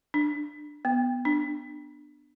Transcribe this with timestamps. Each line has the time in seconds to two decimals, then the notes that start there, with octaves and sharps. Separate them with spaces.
0.14 D4
0.85 B3
1.25 D4